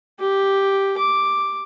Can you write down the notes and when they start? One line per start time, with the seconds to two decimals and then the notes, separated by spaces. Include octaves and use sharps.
0.20 G4
0.98 D6